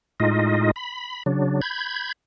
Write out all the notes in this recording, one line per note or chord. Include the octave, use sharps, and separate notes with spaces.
A2 G#3 D#4 F4 D#5
B5
C#3 F#3 D4
B5 G6 G#6